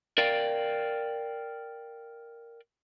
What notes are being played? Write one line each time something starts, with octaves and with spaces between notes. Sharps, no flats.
A#4 D5 F5 G5